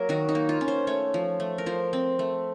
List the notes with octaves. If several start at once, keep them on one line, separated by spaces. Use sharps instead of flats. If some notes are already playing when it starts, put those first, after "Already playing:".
Already playing: F#3 A#3 A#4
D#3 F#4
D#4
A#3
F4
C#4
C5
A3 C#5
F3
A3
A#4
F3 C5
C4
A3